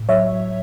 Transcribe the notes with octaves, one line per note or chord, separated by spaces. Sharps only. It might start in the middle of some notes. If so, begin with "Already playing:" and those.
Already playing: A2
F#3 C#5 E5